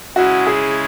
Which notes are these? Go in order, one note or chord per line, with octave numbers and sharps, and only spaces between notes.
C#3 G#3 C#4 E4 F#4
G#4